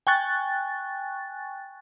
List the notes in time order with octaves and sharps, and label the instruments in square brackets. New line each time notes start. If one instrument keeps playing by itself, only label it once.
[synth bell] G5 G#5 C#6 F#6 A6